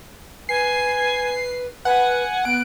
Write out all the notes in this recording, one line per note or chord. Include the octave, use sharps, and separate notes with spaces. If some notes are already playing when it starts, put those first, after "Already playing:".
B4 G#5 C7
B4 F#5 G#5
B3 F#6 D7